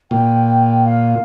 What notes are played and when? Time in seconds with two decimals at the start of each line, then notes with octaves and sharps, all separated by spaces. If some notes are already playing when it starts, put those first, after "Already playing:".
0.11 A#2 G5
0.85 F5